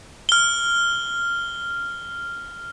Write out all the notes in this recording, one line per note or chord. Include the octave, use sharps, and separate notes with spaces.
F6 G7